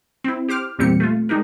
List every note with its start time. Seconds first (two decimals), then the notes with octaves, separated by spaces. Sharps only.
0.24 C4 E4
0.48 G4 C5 D6 F6
0.79 E2 A#2 G3 C4 G4 C#7
1.00 A3 F4
1.29 G#3 D4 D#4 G4 A#4